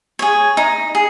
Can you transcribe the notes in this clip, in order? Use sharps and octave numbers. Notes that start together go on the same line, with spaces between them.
G#4 C#5
D#4
G#4